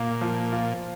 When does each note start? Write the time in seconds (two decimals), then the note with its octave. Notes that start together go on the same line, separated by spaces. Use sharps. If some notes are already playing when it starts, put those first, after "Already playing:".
Already playing: A#2 A#3
0.21 F3
0.52 F4